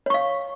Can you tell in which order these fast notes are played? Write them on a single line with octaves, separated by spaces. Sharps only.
C#5 C#6 F5